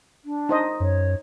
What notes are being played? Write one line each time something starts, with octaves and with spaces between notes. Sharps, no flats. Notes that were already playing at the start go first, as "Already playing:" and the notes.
D4
D#4 C5 D#5
F#2 C#5